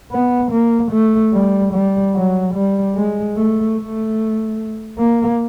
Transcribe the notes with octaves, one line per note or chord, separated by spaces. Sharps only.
B3
A#3
A3
G3
G3
F#3
G3
G#3
A3
A3
A#3